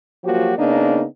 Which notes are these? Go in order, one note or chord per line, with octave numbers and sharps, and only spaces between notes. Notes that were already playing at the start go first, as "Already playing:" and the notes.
F3 F#3 A#3 F#4 G4
C#3 A#3 B3 D4 D#4